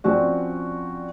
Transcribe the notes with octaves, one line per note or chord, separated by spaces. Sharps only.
F3 C4 C#4 F#4 D5